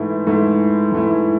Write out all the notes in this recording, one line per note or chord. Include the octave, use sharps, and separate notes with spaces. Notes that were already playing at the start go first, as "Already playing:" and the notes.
Already playing: G#2 E3 A3 E4
G#2 E3 A3 E4
G#2 E3 A3 E4